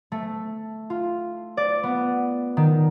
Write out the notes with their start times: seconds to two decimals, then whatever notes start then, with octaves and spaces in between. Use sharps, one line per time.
0.12 A3
0.90 F4
1.57 D5
1.83 B3
2.57 D#3